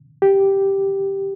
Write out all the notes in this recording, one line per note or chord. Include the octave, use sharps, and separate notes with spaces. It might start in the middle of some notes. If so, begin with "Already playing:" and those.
G4